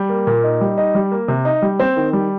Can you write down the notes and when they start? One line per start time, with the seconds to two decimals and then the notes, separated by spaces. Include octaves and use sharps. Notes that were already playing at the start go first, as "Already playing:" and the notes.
Already playing: G3
0.09 A#3
0.27 A#2
0.44 D#4
0.61 G3
0.78 D#4
0.95 G3
1.12 A#3
1.28 C3
1.45 D#4
1.62 G3
1.79 C4
1.96 D#3
2.13 G3